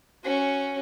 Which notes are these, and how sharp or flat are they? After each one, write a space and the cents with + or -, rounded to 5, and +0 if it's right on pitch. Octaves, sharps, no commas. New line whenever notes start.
C#4 +0 F#4 +0